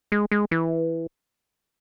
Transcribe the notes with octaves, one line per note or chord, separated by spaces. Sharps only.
G#3
G#3
E3